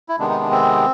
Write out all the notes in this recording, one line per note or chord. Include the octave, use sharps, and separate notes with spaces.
E4
C3 D#3 G#3 B3 D4
D#4
D4
C4